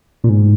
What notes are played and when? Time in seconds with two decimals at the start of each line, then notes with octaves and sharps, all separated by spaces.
0.24 A#2
0.29 G#2